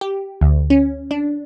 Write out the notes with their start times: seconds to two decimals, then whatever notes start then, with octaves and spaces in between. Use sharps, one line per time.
0.01 G4
0.41 D2
0.70 C#4
1.11 D4